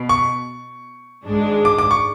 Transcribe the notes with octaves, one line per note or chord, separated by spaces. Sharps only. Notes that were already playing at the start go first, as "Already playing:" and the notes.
Already playing: B2
C#6
G#1 G#2 G#3 D4
D6
D6
C#6